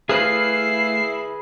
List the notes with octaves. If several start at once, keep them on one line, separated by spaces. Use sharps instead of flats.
A3 E4 G#4 B4 F5 D#6 C7